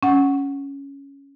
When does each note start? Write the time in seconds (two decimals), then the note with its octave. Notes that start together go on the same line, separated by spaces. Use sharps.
0.03 C#4 F#5